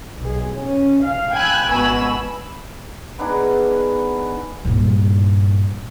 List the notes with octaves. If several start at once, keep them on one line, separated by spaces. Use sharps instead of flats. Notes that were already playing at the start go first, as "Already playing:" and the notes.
B1 G#4
C#4
F5
G5 G#5 B5 E6 F#6 G#6
G#1 B2 G#5 B5 E6
B3 D4 D#4 G#4
G2 A#2